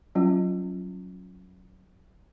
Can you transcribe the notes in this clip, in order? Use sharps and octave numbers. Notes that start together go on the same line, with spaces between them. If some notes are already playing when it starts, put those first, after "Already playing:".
F#3 G3 C#4 F4